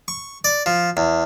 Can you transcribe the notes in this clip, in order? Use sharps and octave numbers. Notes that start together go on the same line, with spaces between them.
C#6
D5
F3
E2